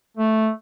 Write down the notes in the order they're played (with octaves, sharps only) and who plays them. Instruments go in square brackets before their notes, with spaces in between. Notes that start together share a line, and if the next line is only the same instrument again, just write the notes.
[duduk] A3